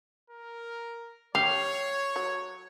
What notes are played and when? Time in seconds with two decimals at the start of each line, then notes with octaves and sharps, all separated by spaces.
0.30 A#4
1.35 G4 C#5 F5
2.16 F#3